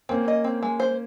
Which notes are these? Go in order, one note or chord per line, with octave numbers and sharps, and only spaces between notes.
A#3 C4 C#4
D#5
C4
G#3
C5